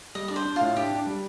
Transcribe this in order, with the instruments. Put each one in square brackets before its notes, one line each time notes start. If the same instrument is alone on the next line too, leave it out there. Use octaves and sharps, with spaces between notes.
[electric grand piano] G3 [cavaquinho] D#5
[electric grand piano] D4 [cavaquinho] D5
[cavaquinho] C5
[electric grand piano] D4
[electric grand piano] A2 [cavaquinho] F4
[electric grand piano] D4 [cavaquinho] G4
[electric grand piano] D4
G3